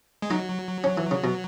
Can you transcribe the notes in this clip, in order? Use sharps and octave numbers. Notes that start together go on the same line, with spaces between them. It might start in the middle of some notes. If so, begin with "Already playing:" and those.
G#3
F#3 D#4
C#4
E3
C#3
B2